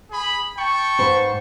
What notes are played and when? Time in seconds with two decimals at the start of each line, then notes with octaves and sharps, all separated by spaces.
0.11 G#4 B5
0.58 G5 A5 C#6
0.99 G#2 B4 C5